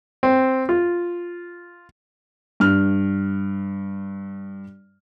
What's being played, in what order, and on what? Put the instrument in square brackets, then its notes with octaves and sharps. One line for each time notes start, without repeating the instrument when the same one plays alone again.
[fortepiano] C4
F4
[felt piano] G2 F6